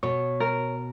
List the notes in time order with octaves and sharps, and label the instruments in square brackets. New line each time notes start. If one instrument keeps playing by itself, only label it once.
[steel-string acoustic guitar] B2 [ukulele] C#5
[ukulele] A#4